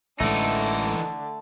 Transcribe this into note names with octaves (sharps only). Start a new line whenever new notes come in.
A1 A2 D3 E3 G#3 A3 D#4